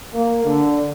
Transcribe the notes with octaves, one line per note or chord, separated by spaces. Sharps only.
A#3
D3